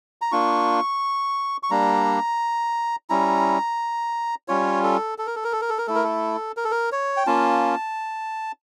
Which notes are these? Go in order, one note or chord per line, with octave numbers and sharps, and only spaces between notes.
A#5
A#3 D4 F4 C#6
C#6
G3 A#3 D4 A#5
G3 C#4 E4 A#5
G3 C#4 F4 C#5
A4
A4
A#4
A4
A#4
A4
A#4
A4
A#4
A3 E4 A4
A#4
A4
A#4
A4
A#4
C#5
G5
A#3 C#4 F4 A5